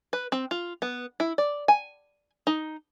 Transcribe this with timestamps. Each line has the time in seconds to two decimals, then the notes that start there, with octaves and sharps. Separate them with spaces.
0.13 B4
0.32 C4
0.51 F4
0.82 B3
1.20 E4
1.38 D5
1.68 G#5
2.47 D#4